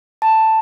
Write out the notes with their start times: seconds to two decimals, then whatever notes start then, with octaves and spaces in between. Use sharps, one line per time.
0.22 A5